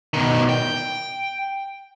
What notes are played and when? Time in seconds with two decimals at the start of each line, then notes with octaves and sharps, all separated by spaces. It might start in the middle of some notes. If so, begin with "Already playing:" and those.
0.14 B2 D#3
0.49 G5